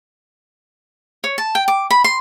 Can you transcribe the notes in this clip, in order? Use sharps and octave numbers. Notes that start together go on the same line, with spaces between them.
C#5
A5
G5
D6
B5
C6